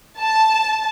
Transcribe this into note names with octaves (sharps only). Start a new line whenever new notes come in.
A5